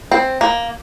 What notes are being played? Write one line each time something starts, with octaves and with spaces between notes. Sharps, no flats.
C4
A#3